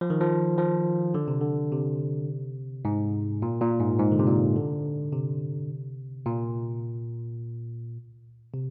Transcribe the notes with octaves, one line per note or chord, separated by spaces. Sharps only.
F3
D#3
F3
F3
D3
C3
D3
C3
G#2
A#2
A#2
G#2
G#2
D3
C3
A#2
D3
C3
A#2
C3